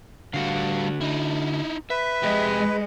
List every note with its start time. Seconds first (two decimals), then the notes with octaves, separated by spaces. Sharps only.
0.34 D3 G3 F#4 F5
1.01 D#4 E4
1.90 B4 E5
2.23 F2 G#3 G4